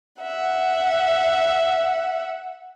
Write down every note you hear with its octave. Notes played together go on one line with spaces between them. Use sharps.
E5 F#5